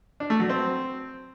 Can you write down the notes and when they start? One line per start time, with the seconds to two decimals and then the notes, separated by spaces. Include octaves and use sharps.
0.20 D4
0.30 A3
0.40 F#3
0.49 C4